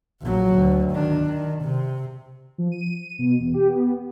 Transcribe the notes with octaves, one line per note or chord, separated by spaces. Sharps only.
A#1 F#3
D2
D#3 D4
D#3
C3
F3
D#7
B2
E2
G4
B3